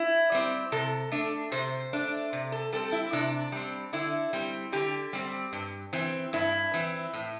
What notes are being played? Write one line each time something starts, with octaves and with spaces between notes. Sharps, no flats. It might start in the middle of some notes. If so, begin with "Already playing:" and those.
Already playing: E4
G3 C4
C3 A4
A3 D4
C3 C5
A3 D4
C3
A4
G3 C4 A4
E4
C3 D4
G3 C4
D3 E4
G3 C4
D3 G4
G3 C4
G2
E3 C4
G2 E4
E3 C4
A2